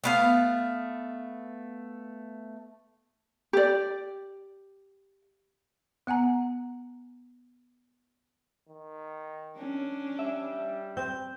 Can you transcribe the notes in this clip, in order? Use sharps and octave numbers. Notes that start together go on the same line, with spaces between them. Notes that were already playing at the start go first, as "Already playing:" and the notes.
A3 B3 F5
G4 D5
B3 F#5 G#5 A#5
D#3
C#4 D4
G3 E5
C4 G6